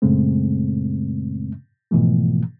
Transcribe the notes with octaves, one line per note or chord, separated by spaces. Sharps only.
F#2 A#2 C#3 G#3 A3 C4
G#2 B2 E3 F3 A3